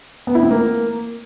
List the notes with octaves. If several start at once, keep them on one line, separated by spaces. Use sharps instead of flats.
B3
E4
C4
A#3